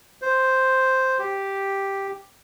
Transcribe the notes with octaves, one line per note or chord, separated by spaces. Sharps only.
C5
G4